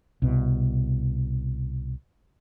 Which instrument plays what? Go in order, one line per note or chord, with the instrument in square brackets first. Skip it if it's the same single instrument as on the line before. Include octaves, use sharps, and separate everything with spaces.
[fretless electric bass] C2 B2